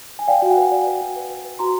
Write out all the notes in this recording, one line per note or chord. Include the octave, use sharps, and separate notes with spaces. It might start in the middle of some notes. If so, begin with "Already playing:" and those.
G#5
D5 F5 G5
F#4
F#5 G#5
B4
D5
B4
F#4
B4
B4
B4
F#4 A#5 C6